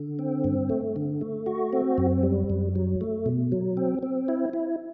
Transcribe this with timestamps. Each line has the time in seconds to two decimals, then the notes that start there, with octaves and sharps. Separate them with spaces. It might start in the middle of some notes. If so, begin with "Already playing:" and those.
Already playing: D3
0.19 C4
0.44 G2
0.70 A3
0.96 D3
1.21 A3
1.46 F#4
1.73 C4
1.98 F#2
2.23 G3
2.50 F#2
2.75 F#3
3.01 A3
3.26 B2
3.52 F#3
3.77 C4
4.03 C4
4.28 E4
4.53 E4